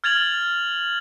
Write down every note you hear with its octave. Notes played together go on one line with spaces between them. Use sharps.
F6 G#6 A6 F7 F#7